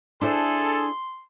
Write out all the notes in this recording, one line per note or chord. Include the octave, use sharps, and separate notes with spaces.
D4 E4 G#4 A4 C5 C6